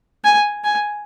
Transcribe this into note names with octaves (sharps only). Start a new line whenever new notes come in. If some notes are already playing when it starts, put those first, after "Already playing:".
G#5
G#5